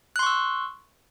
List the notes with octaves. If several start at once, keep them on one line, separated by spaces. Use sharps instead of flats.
C6 C#6 E6 F#6